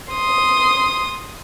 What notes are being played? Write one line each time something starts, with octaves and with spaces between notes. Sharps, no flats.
C6 D#6